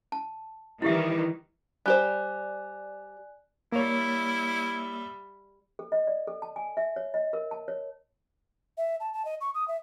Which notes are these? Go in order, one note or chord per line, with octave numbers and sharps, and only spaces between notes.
A5
D#3 E3 G3 E4 G4 E5
G3 G4 C5 D5 G#5 F#6
G3 A#3 E4 C#5 E5
A4
D#5
D5
A4
A5
G#5
E5
C#5
D#5
A#4
A5
C#5
E5
A5
A5
D#5
C#6
D#6
E5